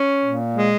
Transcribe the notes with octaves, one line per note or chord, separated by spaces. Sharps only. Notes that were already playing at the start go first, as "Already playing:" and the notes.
Already playing: C#4
A#2
G#3